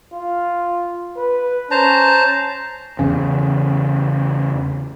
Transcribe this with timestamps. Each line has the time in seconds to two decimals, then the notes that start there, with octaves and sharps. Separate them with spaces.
0.13 F4
1.17 B4
1.71 C#4 C5 A5 A#5
2.99 E2 C#3